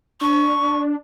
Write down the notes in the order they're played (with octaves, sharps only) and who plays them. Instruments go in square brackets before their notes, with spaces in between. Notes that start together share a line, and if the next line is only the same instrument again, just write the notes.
[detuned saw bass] D4 [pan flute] C#6